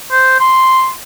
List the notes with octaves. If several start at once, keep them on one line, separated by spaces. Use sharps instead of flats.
C5
C6